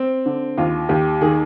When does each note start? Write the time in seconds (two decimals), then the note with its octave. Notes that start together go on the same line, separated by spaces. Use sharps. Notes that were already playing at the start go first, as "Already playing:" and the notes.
Already playing: C4
0.26 D3
0.57 D#2 F4
0.89 D#2 G4
1.21 D#3 G#4